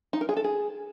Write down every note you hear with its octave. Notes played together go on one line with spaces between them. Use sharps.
D#4
A#4
G#4
A4
G#4